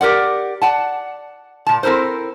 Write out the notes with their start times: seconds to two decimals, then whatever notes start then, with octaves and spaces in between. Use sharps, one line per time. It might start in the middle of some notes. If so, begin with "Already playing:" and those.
0.01 G4 A#4 D5 F#5
0.62 D5 F#5 A5
1.66 A#2 A5
1.83 C4 E4 A4 A#4 C5